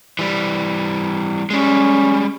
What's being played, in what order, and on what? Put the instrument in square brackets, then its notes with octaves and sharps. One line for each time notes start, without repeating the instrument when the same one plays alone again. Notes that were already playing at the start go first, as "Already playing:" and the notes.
[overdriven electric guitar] E3 G3
[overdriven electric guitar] G3 G#3 [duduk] C#4